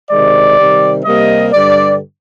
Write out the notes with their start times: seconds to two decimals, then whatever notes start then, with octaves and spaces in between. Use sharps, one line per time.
0.11 C3 D#3 G#3 D5
0.58 C3 D#3 G3
1.04 C3 G3 A#3 D#5
1.52 G2 D3 G3 D5